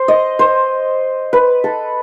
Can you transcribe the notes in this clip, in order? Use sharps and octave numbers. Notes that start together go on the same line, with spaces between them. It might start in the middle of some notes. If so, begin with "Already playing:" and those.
Already playing: C5
D#5
C5
B4
A4